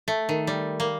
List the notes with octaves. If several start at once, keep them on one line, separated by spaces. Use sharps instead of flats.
A3
D#3
G3
A#3